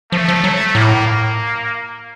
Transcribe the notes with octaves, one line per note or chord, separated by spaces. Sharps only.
F3 A3
F3
F#3
A2 A#3
A#3